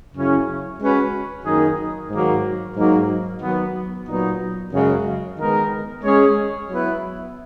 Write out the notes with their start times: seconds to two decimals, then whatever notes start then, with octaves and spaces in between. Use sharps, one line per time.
0.13 F#2 C#3 F#3 C#4 E4
0.79 G#3 C#4 F#4 B4
1.44 F#2 D#3 A#3 D#4 G#4
2.10 G#2 D#3 F#3 A#3
2.75 G#2 F#3 A#3 D#4
3.41 D#3 F#3 B3
4.06 A#2 F#3 B3 D#4
4.72 F#2 C#3 G#3 C#4 F#4
5.38 D#3 G#3 B3 D#4 A#4
6.03 G#3 C#4 G#4 C#5
6.69 F#3 B3 E4 B4